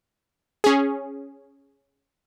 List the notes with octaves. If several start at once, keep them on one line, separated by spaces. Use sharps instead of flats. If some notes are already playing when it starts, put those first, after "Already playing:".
C#4 G#4